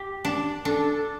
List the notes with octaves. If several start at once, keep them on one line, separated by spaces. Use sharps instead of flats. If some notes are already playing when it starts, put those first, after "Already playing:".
Already playing: G4
D4
D4 A4